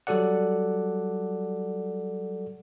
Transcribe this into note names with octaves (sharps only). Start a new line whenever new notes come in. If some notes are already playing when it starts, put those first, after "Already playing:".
F#3 G3 F#4 A4 D5 F#5